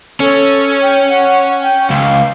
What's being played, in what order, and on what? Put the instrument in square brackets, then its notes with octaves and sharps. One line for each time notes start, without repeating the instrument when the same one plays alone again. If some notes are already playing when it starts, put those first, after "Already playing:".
[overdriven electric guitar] C#4 [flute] A4
[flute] G5
F#5
G5
[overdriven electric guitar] C#2 [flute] F5